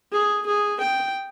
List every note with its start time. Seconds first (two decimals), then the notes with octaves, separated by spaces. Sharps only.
0.12 G#4
0.46 G#4
0.80 G5